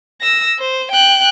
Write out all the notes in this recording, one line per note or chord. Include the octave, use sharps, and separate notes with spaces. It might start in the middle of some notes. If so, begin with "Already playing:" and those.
E6 A#6
C5
G5 F#6